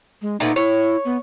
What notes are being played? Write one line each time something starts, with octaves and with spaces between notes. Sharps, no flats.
G#3
A#2 A3 B3 D#4
E4 C#5
B3